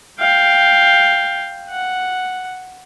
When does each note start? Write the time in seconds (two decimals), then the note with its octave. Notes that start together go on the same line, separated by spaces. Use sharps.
0.19 F5 G5
1.70 F#5